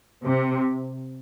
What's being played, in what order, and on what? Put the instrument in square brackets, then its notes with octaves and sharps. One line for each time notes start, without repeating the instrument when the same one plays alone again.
[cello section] C3